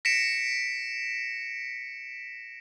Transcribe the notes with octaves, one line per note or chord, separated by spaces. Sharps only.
A#6 B6 C#7 D7 E7